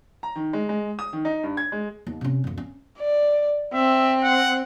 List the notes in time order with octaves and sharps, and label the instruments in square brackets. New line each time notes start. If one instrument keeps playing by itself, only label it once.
[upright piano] A#5
D#3
G#3
G#3
D#6
D#3
D#4
G2
G#6
G#3
[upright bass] D#2
C3 C#4
F#1 D2
C#4
[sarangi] D5
[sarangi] C4 [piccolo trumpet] E5
[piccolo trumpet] F#5